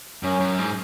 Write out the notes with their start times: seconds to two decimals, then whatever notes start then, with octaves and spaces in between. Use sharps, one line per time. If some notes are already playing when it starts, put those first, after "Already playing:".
0.23 F#2 C#4
0.40 F#2
0.59 G#2